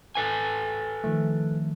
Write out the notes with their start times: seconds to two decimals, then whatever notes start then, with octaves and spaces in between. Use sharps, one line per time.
0.15 A4 B4 G#5
1.04 D#3 F3 A3